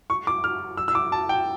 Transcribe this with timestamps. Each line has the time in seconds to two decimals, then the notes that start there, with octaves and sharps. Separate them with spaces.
0.10 C#6
0.27 D6
0.44 F6
0.77 E6
0.88 E6
0.95 D6
1.12 A5
1.29 G5